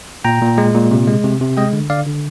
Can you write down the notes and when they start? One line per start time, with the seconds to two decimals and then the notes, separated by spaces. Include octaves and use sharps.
0.24 A#2 G5 A#5
0.42 A#2
0.58 G#3
0.75 A#2
0.91 C3
1.07 G#3
1.24 C3
1.41 C3
1.57 G#3 D#5 G5
1.73 D3
1.90 D3 D5 F5
2.06 D3